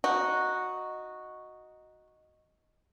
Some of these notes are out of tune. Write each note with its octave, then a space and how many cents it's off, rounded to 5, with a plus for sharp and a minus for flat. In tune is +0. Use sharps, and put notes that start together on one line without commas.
D#4 +0 F#4 -5